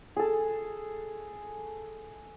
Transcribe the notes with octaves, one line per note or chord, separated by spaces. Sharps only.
G#4 A4